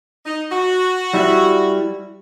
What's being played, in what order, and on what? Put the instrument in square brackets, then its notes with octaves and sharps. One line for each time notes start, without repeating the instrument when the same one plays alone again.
[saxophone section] D#4
F#4
[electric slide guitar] G3 E4